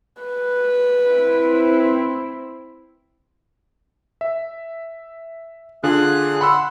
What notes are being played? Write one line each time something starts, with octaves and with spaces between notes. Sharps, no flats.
B4
C4 E4
E5
D3 D4 F4 G#4 F#6
F#5 B5 C6 E6